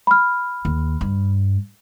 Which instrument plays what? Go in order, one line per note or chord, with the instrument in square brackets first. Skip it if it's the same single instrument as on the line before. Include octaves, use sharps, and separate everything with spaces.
[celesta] B5 F6
[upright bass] D#2
G2